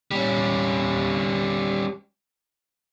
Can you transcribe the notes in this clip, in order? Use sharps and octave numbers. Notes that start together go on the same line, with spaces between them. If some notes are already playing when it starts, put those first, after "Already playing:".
G3 C#4